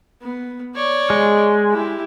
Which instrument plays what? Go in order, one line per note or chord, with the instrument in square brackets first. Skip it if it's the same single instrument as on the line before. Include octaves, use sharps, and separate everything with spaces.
[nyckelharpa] B3
C#5 D5
[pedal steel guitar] G#3
[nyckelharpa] E4 G4